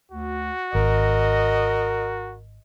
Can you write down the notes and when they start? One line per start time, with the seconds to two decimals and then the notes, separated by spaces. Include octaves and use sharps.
0.12 D2 F#4
0.75 G#1 A#4 D#5